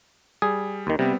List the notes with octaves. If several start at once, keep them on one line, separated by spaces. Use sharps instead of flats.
G3 G#4
D#2 D#3
C3 G3 B3 C4